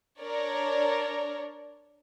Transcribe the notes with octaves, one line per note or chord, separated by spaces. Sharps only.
D4 A#4 C#5 D5